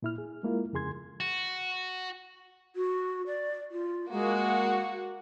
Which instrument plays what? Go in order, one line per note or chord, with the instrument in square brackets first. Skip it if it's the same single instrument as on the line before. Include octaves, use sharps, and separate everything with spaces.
[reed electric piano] A#2 E4 F6
G#4
G#3 A#3 E4 F4 A#4
F2 C#3 G#4 C6 G#6
[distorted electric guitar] F#4
[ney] F#4
D5
F4
[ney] G#3 [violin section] A#3 F#4